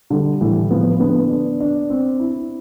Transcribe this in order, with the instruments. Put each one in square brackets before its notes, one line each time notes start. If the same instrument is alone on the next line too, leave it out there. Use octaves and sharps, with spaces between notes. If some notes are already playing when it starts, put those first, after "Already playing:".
[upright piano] D3 [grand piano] G3
[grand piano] A2 [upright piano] E3
[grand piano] F3 [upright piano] B3
[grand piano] D3 [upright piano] B3
[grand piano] D4
D4
C4
E4